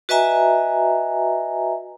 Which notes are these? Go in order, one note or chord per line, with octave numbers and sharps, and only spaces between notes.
F#4 B4 D#5 E5 G#5 A#5